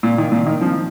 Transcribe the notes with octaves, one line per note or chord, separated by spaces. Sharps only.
A#2
D#3
A#2
D#3
F3